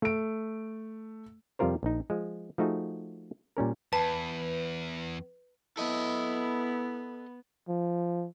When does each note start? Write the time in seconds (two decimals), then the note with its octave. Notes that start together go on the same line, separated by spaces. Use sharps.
0.02 A3 D7
1.59 F2 C3 G3 F4 A#4 C5
1.83 A#1 D#4
2.10 F3 G#3
2.58 F3 A3 D#4 F#4 G#4
3.57 A#2 G3 C#4 A#4
3.93 E2 B4 A5
5.77 B3 E4 A4 D#5
7.68 F3